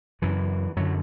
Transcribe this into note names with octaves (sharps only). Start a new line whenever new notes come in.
F#2 C#3 E3
F#2 D3 F#3